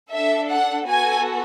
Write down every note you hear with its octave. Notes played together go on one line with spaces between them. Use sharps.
D4 A4 E5
F#5
B3 F#4 A4 G#5